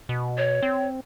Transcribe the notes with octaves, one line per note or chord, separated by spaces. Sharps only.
B2
C#5
C4